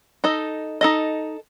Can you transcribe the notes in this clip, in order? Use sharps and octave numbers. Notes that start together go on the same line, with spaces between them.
D#4 A4 D#5
D#4 A4 D#5